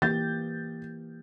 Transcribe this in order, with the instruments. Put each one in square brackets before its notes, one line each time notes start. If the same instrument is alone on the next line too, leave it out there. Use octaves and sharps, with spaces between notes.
[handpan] E3 A#3 G4 [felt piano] G6 A6